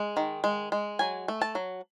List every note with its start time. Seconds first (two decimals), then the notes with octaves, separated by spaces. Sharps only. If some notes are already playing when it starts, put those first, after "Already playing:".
Already playing: G#3
0.17 D#3
0.44 G#3
0.72 G#3
0.99 F#3 G#5
1.28 A3
1.41 A5
1.55 F#3